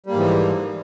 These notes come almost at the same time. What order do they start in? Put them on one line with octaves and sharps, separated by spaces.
G3 A#3 G#2 E3 F3